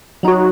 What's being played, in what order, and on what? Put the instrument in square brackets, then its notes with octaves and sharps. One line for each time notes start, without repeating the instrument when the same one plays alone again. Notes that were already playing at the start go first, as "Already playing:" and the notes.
[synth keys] F#3 D#4 F#4